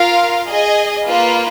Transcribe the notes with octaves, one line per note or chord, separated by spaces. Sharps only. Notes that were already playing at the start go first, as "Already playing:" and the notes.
Already playing: F4 A#4 F5
G#4 D#5 G#5
A#3 F4 B4 F5